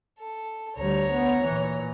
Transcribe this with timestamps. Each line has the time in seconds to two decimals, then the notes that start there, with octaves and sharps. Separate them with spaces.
0.19 A4
0.77 D2 G3 C#5 A#5
1.11 B3
1.44 A#2 E3